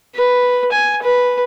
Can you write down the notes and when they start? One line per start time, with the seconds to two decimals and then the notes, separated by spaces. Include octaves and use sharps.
0.16 B4
0.72 G#5
1.03 B4